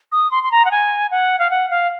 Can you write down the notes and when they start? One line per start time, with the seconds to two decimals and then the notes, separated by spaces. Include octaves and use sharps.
0.12 D#6
0.31 C6
0.43 C6
0.51 A#5
0.65 F#5
0.71 G#5
1.11 F#5
1.39 F5
1.50 F#5
1.70 F5